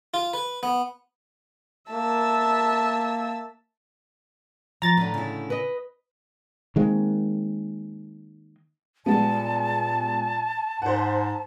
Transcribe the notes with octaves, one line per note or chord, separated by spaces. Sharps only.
F4
B4
B3
A#3 E5 A5 E6
F3 A#5 A6
A2 D3 B4
C#3 E4
B4 D#5
D#3 G#3 A#3 C4
A#2 G3 G#3 B3 A5
G#2 C5 F#5